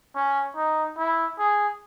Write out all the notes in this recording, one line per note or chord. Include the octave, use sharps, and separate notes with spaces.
C#4
D#4
E4
G#4